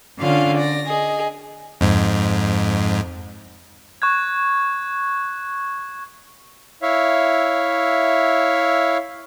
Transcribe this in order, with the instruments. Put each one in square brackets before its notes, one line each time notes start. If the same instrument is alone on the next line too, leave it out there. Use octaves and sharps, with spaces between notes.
[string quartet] D3 C#4 F4 F5
D5 A#6
G#4 D#5
[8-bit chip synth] F2 G#2
[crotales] C#6 F#6 G#6
[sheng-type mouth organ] E4 C#5 E5 F5